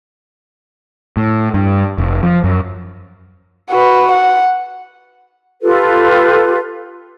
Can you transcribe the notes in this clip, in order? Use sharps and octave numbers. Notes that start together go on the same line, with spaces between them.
A2
G2
F1
F3
F#2
F#4 B4
F#5
F4 G4 A4 B4